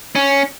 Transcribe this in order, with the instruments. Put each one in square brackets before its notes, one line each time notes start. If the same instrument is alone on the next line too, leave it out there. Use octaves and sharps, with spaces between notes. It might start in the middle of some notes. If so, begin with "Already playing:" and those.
[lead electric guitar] C#4